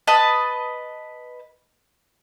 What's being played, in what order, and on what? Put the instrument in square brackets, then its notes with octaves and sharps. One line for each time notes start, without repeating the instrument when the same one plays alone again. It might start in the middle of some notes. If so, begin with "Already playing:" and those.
[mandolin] B4 D#5 A5